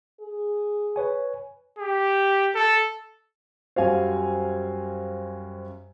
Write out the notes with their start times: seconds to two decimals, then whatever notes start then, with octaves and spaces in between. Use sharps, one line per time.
0.21 G#4
0.96 B4 C#5 G#5
1.79 G4
2.55 A4
3.76 F#2 G3 F#4 C5 F5 G#5